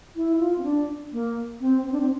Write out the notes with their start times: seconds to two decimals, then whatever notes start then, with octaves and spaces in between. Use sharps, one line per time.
0.16 E4
0.40 F4
0.58 C4
0.64 D4
1.13 A#3
1.61 C4
1.86 C4
1.92 D4
2.00 C4